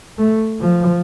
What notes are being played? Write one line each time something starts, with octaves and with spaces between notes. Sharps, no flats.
A3
F3